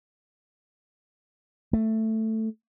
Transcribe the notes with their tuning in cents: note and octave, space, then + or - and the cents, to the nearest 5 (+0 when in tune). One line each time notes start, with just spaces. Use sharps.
A3 +5